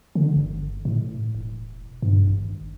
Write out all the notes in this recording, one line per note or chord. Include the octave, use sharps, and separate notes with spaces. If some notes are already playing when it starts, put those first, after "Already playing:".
D3
G1
A2
E1
G2
G#1